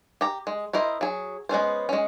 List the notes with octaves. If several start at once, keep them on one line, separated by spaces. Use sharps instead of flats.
G4 A#5
G#3
E4 A#4 C5 D#5
F#3 G#4
G#3 B3 C#4 C5
G#3 C#4